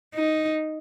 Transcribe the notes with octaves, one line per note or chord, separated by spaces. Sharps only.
D#4